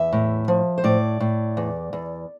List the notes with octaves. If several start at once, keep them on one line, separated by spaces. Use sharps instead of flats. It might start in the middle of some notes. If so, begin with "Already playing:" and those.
Already playing: E2 E5
A2
F3
C5
A2 D5
A2
E2
E2